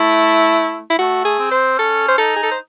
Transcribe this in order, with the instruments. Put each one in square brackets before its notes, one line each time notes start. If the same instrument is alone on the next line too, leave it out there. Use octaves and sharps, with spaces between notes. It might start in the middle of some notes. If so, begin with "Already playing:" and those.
Already playing: [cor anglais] A3 [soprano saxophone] E4
[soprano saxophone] E4
[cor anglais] A3 [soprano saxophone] F#4
[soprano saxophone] G#4
[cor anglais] C4
[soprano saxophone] C5
[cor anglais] C#4 [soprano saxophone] A4
[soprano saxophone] C5
[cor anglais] D#4 [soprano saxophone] A4
[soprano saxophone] G#4
A4
C5